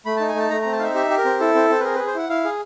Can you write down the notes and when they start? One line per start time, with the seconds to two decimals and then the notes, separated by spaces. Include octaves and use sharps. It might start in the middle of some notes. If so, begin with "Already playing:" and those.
0.06 A3 B5
0.17 D#4 A5
0.28 G#5
0.35 A3 A5
0.50 A3 A#5
0.62 C4 A#5
0.72 A5
0.79 D#4 E5 F5
0.95 G4 E5
1.10 G4
1.18 A#4
1.25 C4
1.40 E4 A4
1.55 C4
1.70 C4
1.80 B4
1.84 G#4 A#4
1.95 G#4 B4
2.07 C5
2.15 E4 F#5
2.29 E4 F5
2.45 G#4